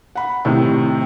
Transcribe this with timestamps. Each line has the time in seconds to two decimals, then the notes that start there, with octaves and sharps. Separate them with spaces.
0.15 F#5 B5
0.45 A2 C3 D#3